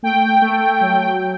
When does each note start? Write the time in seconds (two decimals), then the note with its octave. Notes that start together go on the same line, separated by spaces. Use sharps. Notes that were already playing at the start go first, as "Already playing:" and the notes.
0.03 A3 G5
0.42 A3
0.81 F#3